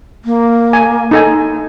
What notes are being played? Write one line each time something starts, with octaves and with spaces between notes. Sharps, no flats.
A#3
G#5
D#4 A4 G#5